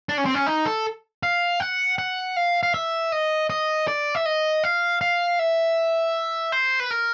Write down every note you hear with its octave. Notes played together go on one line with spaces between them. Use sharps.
D4
C#4
C4
C#4
D#4
A4
F5
F#5
F#5
F5
F5
E5
D#5
D#5
D5
E5
D#5
F5
F5
E5
C5
B4
A#4